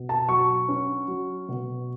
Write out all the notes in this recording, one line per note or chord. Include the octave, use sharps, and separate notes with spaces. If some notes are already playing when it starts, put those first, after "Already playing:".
Already playing: B2
A5
F#3 C#6
C#4
F#3
B2